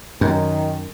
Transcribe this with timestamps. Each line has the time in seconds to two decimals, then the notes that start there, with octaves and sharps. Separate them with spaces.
0.21 F#2 D#3